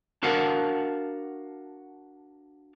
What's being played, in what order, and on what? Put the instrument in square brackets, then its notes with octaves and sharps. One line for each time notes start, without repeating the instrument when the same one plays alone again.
[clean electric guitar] D4 F#4 A#4 F5 F#5 A5